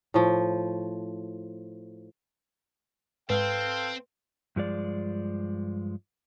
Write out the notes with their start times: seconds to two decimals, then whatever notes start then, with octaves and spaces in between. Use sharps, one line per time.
0.14 A2 F3
3.30 G#2 C4 A4 B4 F5 G5
4.56 G2 F3 G#3 D5